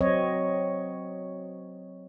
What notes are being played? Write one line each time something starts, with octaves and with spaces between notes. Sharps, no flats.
F#3 C4 C#5 D#5